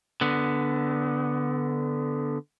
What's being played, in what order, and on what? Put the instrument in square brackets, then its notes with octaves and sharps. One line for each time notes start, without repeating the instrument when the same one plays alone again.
[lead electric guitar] D3 B3